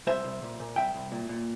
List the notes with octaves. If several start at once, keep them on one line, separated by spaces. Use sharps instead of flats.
C2 C5 E5
C2
A#2
A#2
C2 E5 G5
C2
A#2
A#2